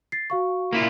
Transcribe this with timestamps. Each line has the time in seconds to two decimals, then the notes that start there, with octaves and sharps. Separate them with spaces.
0.12 A6 C7
0.30 F#4 F5 C#6
0.73 A#3 E4 F4